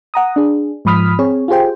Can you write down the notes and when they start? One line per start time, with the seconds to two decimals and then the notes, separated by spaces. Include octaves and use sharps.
0.14 F#5 A#5 D#6
0.36 D4 G#4
0.85 G#2 F3 B5 D#6 F6 B6
1.19 C4 G#4 C#5
1.48 F4 G4 G#4 C5 G5